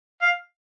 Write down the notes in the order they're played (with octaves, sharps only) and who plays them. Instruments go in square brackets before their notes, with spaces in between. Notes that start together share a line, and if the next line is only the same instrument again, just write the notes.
[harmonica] F5